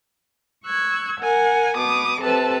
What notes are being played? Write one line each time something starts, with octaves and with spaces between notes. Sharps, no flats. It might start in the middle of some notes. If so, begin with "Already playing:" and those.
C#6 E6 F#6 G#6
A#4 F#5 G#5
B2 D6 D#6
C3 A4 B4 A5